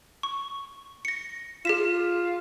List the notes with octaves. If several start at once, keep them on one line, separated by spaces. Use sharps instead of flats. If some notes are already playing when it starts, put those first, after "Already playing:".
C#6
A#6 C#7
F4 G#4 B6 E7